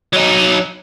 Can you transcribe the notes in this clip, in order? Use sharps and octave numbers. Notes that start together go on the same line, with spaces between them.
F#3 D#4